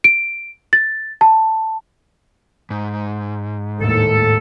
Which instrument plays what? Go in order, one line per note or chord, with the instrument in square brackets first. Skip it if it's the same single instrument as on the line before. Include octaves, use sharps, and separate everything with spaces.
[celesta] D7
A6
A5
[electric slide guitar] G#2
[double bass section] D#2 A2 [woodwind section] A4